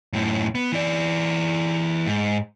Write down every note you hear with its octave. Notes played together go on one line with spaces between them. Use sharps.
F#2 A2
B3
E3 D5
G#2